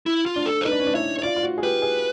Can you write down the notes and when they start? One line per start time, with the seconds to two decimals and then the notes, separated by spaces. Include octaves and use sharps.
0.06 E4
0.26 F4
0.36 D4
0.46 A4
0.61 C5
0.65 D#4 B4
0.72 D4
0.80 C#4
0.87 D4
0.94 E4 C#5
1.19 C#5
1.23 F4 D5
1.36 F4
1.43 F#4
1.58 G#4
1.63 G4 B4
1.82 G#4